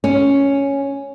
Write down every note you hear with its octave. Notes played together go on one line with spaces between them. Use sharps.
C#4